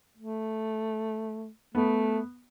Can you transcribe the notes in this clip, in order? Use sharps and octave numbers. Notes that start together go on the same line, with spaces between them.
A3
A3 B3